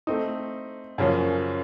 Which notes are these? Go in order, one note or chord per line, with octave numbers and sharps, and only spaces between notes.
A3 C4 D#4
F#2 C#3 F3 A#3 C#4